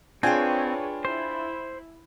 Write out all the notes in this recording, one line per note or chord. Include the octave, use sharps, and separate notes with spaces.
C4 D4 F4 G#4 B4 C#5 G5 G#5
E4 C5